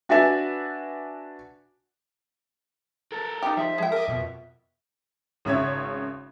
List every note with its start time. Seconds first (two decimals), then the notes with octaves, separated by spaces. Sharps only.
0.09 D4 F#4 B4 D5 E5 G#5
3.12 A4 A#4
3.43 D#4 G4
3.57 F3 E5
3.78 G#3 G5
3.92 A#4 D#5 D6
4.08 F2 B2
5.45 G#1 C#3 C#5 E5 G#6